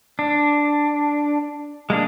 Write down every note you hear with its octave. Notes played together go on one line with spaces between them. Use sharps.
D4
G#3 A#3 D4